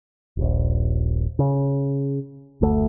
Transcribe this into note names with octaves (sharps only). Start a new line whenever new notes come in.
D#1 A#1
C#3
F#1 D2 A3